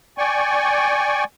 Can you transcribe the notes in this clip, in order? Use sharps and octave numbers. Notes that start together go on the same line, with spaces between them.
D5 G5 G#5 C#6